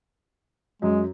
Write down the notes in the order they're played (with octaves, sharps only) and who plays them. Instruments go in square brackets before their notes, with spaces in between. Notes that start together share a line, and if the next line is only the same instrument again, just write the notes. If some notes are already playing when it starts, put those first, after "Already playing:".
[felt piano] F#2 [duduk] G#3